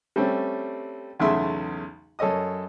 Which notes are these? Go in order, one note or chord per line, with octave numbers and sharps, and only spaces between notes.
G3 A3 C4 C#4
B1 E2 C#3 A3 E5 C6
F#2 A4 C#5 D#5 D#6